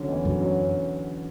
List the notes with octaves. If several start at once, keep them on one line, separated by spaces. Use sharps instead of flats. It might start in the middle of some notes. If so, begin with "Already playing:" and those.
Already playing: D3 F#3 C#4
E2
F#2 D3
F#3
C#4